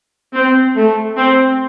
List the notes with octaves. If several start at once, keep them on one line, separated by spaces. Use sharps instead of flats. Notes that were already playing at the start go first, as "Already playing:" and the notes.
C4
A3
C4